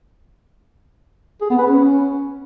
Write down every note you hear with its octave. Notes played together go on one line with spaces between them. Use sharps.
G#4
B3
B4
C#4